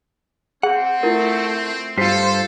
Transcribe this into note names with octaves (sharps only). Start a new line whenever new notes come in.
C4 G#4 F#5
A3 E4 F4 A#4
G2 F4 G4 A4 C5 B6 C7